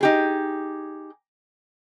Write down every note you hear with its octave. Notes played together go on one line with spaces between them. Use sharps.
D#4 G4 G#4